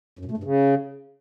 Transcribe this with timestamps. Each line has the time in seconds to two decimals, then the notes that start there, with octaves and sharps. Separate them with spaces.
0.19 F#2
0.25 B2
0.31 A3
0.37 G2
0.44 C#3